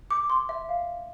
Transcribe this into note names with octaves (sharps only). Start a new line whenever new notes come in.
D6
C6
E5
F5